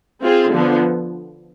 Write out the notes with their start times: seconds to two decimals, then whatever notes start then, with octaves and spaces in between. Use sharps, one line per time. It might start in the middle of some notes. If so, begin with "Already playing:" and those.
0.22 C4 F4 G#4
0.51 D3 F3 B3